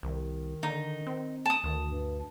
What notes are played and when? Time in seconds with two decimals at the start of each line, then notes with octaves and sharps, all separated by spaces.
0.03 C2 D#3
0.63 D3 D#4
1.07 C4
1.46 A5 D#6
1.64 D2 D#3
1.90 G2